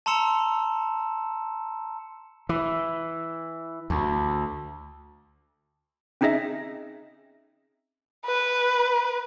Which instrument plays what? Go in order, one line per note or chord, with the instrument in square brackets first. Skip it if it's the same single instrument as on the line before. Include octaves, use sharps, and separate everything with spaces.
[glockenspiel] A5 A#5 C6 E6 C#7 E7
[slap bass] E3
D2
[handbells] C4 C#4 D#4 G#4 D#5 E5
[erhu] B4